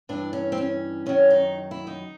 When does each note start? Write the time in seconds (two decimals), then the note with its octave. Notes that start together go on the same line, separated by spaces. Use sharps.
0.09 G2 E3 D4
0.33 C#4
0.52 C4
0.57 C#4
1.06 F#2 D#3 F#3 C#4
1.30 D#4
1.71 E4
1.87 D#4